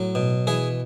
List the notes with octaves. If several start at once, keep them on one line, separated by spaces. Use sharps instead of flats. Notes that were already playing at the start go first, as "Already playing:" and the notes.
Already playing: A2 F#3
B2
E3 G#4